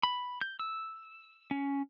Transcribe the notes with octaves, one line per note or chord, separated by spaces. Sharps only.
B5
G6
E6
C#4